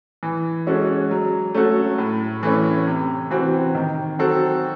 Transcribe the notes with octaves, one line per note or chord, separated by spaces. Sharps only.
E3
G#3 C#4 F#4 A4
F#3
A3 C#4 F#4 A4
A2
E3 A3 C#4
C3
E3 C4 F#4
D#3
F#3 C4 F#4 A4